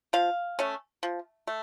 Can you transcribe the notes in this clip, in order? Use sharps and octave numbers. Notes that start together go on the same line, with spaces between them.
F3 F5
A3 C#4
F3
A3